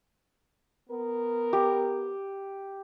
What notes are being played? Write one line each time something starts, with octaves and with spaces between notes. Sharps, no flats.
B3 A#4
G4